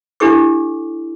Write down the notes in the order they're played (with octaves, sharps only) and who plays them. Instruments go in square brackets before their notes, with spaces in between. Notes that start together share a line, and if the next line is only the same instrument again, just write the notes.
[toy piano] D4 E4 G4 A4 D6